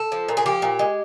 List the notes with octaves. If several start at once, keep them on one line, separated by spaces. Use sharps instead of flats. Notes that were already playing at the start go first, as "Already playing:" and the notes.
Already playing: A4
F3
A#2
G#4
F3 G4
A#2
G#3